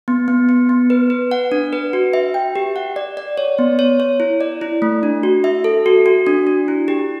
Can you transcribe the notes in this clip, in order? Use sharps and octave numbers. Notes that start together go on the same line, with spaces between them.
B3
B3
B3
B3
B4
B4
F#5
D4
B4
F#4
E5
G5
G4
F#5
D5
D5
C#5
B3
C#5
C#5
E4
D5
E4
A3
D4
F#4
E5
A4
F#4
F#4
D4
D4
E4
G4